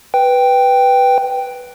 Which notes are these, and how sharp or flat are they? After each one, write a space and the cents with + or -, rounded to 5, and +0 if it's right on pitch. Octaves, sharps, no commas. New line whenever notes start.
B4 +0 G5 +0